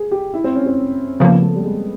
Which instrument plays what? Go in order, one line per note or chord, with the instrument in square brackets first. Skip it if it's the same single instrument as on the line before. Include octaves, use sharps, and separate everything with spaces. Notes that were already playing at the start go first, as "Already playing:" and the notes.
Already playing: [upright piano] G#4
G4
E4
C4
C#4
C4
[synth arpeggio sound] C#3 F3 A#3 [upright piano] B3
[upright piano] A3
G3
G#3